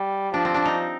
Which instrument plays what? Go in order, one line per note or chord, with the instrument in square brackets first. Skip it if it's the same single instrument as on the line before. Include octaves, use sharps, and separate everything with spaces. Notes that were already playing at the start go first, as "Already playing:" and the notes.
Already playing: [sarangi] G3
[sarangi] F3 [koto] D4
[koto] C4
D4
D#4